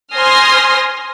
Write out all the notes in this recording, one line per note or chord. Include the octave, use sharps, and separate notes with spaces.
C5 G#5 C6 D#6 F6 A#6